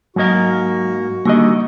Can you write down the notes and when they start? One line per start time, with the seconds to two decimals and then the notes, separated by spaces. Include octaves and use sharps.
0.16 G#2 F#3 A#3 F#4 A#4 D#5
1.25 D3 D#3 G3 A#3 D#5